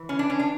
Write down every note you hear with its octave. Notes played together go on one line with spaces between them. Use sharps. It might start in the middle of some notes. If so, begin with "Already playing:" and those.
Already playing: E3
C#4
D4
C#4
D4